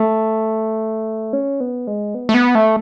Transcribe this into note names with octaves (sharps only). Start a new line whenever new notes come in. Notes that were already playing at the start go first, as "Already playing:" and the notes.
Already playing: A3
C#4
B3
G#3
B3
A3
B3
A3